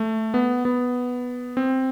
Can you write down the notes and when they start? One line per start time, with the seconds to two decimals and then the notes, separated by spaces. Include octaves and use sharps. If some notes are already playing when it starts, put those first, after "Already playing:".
Already playing: A3
0.34 B3
0.65 B3
1.57 C4